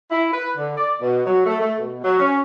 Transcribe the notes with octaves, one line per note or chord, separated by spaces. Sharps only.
E4
B4
D3
D5
B2
F#3
A3
A3
B2
F#3
C#4